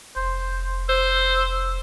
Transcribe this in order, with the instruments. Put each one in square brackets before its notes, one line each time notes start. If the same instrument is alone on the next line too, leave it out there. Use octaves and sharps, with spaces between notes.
[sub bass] F1 [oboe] C5
[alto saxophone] C5 [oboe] E6